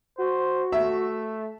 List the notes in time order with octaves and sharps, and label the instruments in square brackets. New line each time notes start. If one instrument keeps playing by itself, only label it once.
[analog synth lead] F#4 [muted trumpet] C5
[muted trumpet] A3 [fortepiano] E5